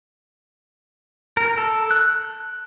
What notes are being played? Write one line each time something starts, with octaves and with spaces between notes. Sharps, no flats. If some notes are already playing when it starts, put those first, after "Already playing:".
A#4
A4
F#6